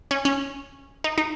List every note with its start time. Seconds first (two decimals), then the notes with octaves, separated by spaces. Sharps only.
0.11 C#4
0.25 C#4
1.04 D#4
1.18 D#4